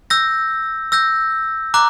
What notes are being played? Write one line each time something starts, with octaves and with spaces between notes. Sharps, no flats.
E6 G6 A#6
E6 G6 A#6
A#5 D6 F#6